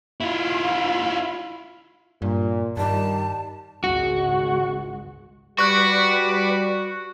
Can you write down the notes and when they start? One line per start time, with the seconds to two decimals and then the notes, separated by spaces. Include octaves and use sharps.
0.21 E4 F4
2.22 G2 A#2
2.77 G2 D#3 G3 A5
3.84 G#1 C#2 G#3 F#4
5.58 G3 F#4 B4 D5 C#6 F#6